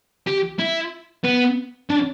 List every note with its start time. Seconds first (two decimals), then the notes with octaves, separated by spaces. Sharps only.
0.27 G4
0.59 E4
1.24 B3
1.90 D4